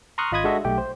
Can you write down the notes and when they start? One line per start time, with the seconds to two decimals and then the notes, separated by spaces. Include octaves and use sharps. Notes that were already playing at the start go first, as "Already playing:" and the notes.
0.18 A#5 C6 C#6 D#6 F6 F#6
0.32 G#1 F4 D#5 B5 D#6 G#6
0.44 G#3 D4 F#4 A4 D#5 E5
0.65 B1 A3 G4 G5
0.78 C5